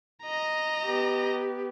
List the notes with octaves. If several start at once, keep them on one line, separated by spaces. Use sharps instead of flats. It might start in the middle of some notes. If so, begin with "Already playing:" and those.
D#5 A#5
B3 G4